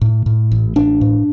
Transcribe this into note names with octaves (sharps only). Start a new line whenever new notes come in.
A2
A2
A1
A1 D4
A2